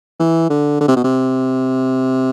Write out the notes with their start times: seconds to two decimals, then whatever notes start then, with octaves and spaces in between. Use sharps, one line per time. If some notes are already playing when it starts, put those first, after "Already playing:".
0.20 E3
0.50 D3
0.81 D3
0.88 C3
0.97 B2
1.04 C3